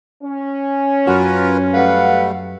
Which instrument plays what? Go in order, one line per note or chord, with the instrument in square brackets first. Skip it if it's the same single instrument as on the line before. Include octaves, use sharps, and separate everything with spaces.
[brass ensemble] C#4
[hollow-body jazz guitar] F#2 F#4 [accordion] F4 A#4 B4
[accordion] G3 A3 [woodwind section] B4 F5 F#5